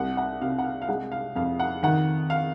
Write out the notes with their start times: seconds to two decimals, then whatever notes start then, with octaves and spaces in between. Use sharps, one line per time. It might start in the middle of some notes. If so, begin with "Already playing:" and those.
Already playing: C2 F#5
0.17 F#5
0.41 C3 F5
0.58 F#5
0.64 F5
0.82 F5
0.89 G#3 F#5
1.12 F5
1.36 F2 F5
1.59 F#5
1.83 D#3 F#5
2.30 F5